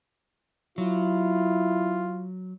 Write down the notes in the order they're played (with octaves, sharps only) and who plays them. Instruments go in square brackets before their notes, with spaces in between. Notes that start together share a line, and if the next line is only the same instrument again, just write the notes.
[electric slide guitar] F#3 [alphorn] E4 [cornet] F4